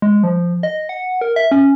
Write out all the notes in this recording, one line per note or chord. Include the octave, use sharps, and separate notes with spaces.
G#3
F3
D#5
F#5
A#4
E5
C#4